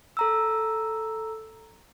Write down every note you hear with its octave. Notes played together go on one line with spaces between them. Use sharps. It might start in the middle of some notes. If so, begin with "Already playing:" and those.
A4 A#5 E6